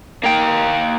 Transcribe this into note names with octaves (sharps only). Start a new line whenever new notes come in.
A#3 G5